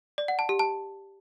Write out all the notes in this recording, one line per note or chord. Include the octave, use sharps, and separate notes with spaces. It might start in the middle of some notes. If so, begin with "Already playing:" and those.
D5
F#5
A5
G4
A5